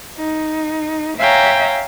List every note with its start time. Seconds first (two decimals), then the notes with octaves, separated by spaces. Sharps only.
0.17 D#4
1.18 C#5 E5 F5 G5 G#5 A#5